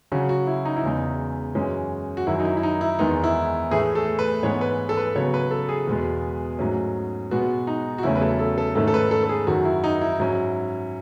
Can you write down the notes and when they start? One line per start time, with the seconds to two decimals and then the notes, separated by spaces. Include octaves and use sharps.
0.12 C#3 F#3 C#4 F#4
0.29 F#4
0.47 E4
0.65 D#4
0.77 E4
0.83 E2 C#3 G#3 D#4
1.55 F#2 E3 G#3 C#4
2.17 F#4
2.27 F#2 D#3 F#3 E4
2.40 D#4
2.45 E4
2.57 E4
2.63 D#4
2.81 E4
2.99 E2 D#3 G#3 B3 D#4
3.24 E4
3.71 A2 E3 A3 G#4
3.95 A4
4.19 B4
4.43 G#2 E3 G#3 B3 C#5
4.61 B4
4.89 A4
4.97 B4
5.15 C#3 F#3 B3 C#5
5.34 B4
5.51 A4
5.69 G#4
5.87 E2 B2 G#3 B3
6.59 G#2 F#3 A3 C#4
7.31 B2 G#3 B3 F#4
7.67 D#4
7.98 F#4
8.03 E2 C#3 F#3 A3 C#4 E4
8.16 B4
8.22 A4
8.39 A4
8.58 A4
8.75 G#2 D#3 A3 C#4 A4
8.87 A4
8.94 B4
9.11 A4
9.23 A4
9.29 G#4
9.47 F#2 D#3 F#3 F#4
9.65 E4
9.84 D#4
10.01 E4
10.20 G#2 F#3 C#4